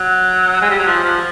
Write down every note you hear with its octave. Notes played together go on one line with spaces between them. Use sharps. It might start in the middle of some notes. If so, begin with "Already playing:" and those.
Already playing: F#3
G#3
G3
F#3
F3
F3